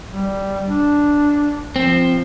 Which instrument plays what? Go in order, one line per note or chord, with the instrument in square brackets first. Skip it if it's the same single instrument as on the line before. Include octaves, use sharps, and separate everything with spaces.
[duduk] G3
D4
[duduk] F3 [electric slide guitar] C4